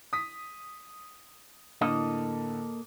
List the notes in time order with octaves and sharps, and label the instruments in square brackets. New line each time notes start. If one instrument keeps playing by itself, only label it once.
[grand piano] D#6 B6
[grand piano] A2 D3 [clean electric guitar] A#3 A4 D#5